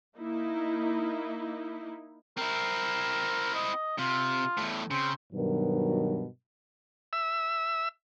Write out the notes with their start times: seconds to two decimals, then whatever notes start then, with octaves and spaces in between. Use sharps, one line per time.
0.17 A#3 D#4 E4
2.38 C4 E4 A#4
3.54 D#5
3.98 C3 F4
4.58 E2 A2
4.91 C#3 C4
5.33 G2 B2 D#3 F#3 A#4
7.13 E5 E6